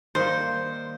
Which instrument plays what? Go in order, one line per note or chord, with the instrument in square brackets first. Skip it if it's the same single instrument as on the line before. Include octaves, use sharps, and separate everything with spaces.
[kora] D#3 G3 A#3 [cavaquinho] C5